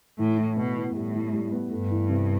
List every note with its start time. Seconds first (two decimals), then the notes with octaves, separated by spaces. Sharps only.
0.18 A2 E3
0.38 E3
0.57 B2 B3
0.76 E3
0.95 A2 G3
1.14 E3
1.33 G3
1.52 B3
1.71 G2 A3
1.91 E3
2.09 C3